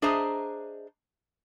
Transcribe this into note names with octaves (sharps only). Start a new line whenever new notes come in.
D4 G#4 C5 D#5 E5 A#5